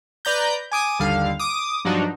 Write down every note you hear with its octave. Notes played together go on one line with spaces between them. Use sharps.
B4 D5 A#5 G6
G#5 D6 D#6
G1 D#2 D3 G3 F5
D6 D#6
G2 F3 F#3 D4 D#4 F#4